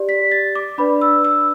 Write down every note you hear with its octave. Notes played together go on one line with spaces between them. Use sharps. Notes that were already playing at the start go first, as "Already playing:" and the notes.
Already playing: G4 D5
B6
A6
D6
D4 B4 D5 B5
E6
E6